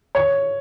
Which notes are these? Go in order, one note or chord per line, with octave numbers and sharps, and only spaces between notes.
C#5